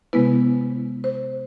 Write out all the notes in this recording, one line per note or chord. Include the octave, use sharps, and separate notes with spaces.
C3 G#3 B3 E4 B4
C5